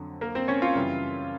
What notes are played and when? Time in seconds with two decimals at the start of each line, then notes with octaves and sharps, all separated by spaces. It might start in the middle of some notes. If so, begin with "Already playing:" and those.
Already playing: F2 D3 F#3
0.21 A#3 A#4
0.35 C4 C5
0.48 C#4 C#5
0.62 F4 F5
0.75 F#2 C#3 E3 G3